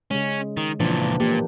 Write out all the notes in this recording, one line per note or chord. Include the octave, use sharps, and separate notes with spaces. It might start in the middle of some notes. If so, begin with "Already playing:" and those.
C#3 G#3 C#4
D#3
C#2 A#2 E3 F3 D4
A#2 A#3 G4